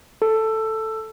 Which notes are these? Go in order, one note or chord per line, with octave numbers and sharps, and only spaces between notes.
A4